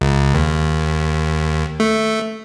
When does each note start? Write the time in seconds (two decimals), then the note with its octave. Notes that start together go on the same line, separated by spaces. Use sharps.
0.01 C#2
0.34 D#2
1.80 A3